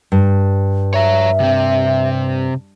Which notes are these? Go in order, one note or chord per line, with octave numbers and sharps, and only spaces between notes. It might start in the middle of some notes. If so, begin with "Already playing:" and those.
G2
C#5 E5 A#5
C3 C4